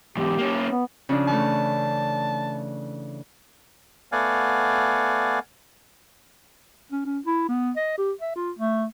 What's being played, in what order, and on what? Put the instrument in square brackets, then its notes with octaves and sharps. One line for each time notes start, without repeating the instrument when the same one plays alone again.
[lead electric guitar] E2 G#2 [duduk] G4
[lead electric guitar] A#3 C#4
[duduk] B3
[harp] C#3 F3 D4
[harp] E3 A3 [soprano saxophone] A5
[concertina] A3 B3 D5 F5 F#5 G#5
[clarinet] C#4
C#4
E4
B3
D#5
G4
E5
F4
A3